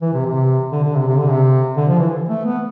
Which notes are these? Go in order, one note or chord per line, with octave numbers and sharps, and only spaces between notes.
E3
C3
C3
D3
D3
C3
C3
D3
C3
D3
F3
E3
A3
B3